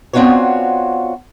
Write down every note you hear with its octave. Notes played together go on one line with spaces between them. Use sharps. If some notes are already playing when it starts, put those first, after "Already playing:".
B3 C4 D4 F4 F#4 C#5